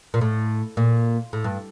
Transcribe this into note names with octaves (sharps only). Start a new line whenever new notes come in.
A#2
A2
A#2
A2
G2